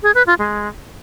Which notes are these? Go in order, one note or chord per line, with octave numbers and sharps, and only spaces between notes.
G#4
B4
F4
G#3